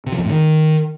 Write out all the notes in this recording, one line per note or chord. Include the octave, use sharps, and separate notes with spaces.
C3
F3
F2
A2
D#3